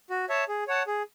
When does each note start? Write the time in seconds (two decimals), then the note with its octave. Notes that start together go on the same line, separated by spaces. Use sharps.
0.10 F#4
0.29 C#5 E5 A5
0.48 G#4
0.67 C#5 F#5 A5
0.87 G#4